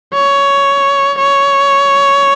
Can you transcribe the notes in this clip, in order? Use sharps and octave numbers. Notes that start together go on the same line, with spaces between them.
C#5
C#5